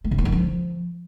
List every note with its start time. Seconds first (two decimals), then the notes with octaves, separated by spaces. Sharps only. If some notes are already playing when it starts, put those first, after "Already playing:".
0.04 A3
0.11 C#3
0.18 A#3
0.25 D#3
0.32 F3